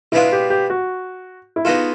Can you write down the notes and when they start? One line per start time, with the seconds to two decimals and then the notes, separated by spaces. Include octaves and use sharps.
0.12 B2 G#3 B3 D4 E4 F4
0.32 G4
0.50 G4
0.70 F#4
1.56 E4
1.65 G#3 B3 D#4 F4 F#4 A4